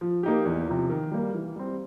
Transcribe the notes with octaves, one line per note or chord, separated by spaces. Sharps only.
F3
A#3 D#4 G4
E2
C3 F3
D#3
G3 A#3
E3
G3 C4